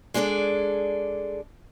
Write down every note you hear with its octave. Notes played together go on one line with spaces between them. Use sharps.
G#3 D4 G#4 A4 D5